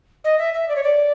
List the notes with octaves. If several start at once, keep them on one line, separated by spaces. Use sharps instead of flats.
D#5
E5
E5
D5
C#5
D5